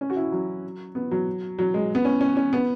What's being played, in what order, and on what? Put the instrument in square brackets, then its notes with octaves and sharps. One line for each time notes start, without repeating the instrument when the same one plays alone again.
[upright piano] C#4
F#4
E4
F#3
B3
F#3
F#3
G#3
B3
C#4
C#4
C#4
B3